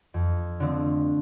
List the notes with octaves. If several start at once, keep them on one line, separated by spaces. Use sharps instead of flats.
F2
D3 F3 A3 C4